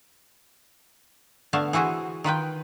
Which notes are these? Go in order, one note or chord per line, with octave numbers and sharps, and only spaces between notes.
D3 A3 B3 F5 A5
E3 E4 F#4 G#4 C5
D#3 F4 B4 G5